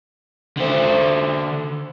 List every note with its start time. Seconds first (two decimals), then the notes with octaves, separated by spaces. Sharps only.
0.57 D3 C5